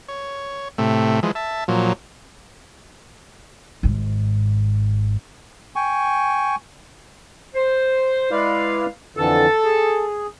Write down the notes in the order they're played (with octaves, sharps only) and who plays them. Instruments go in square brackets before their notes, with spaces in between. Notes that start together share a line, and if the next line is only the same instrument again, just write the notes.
[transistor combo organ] C#5
A2 C3 A3
E3 F3 G#3
E5 A5
A#2 F3 F#3
[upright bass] G#1 G#2
[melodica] G5 G#5 C#6
[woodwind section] C5
[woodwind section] G#3 F5 [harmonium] E4 B4 D5
[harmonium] F2 D3 E3 [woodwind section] A4
[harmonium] G#4